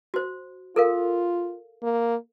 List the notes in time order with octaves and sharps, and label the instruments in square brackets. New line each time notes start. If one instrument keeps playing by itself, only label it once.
[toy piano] F#4 C5
[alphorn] F4 [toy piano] A4 A#4 F5
[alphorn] A#3